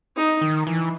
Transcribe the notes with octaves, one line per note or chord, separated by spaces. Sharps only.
D#4
D#3
E3